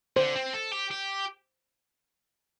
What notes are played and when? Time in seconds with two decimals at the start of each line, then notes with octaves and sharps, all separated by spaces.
0.16 D3 C5
0.35 C4
0.54 A4
0.73 G4
0.91 G4